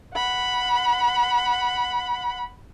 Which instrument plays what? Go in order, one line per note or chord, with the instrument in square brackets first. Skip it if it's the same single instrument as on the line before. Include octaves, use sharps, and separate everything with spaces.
[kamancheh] F#5 B5